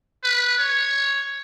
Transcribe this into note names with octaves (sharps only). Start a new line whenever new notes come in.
B4
C#5